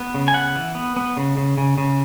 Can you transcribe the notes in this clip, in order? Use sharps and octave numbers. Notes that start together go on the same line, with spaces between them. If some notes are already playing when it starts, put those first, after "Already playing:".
Already playing: B3
C#3
G#5
B3 F#5
E3
B3
B3
C#3
C#3
C#3
C#3